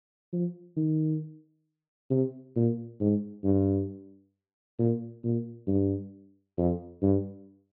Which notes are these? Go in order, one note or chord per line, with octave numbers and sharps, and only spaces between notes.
F3
D#3
C3
A#2
G#2
G2
A#2
A#2
G2
F2
G2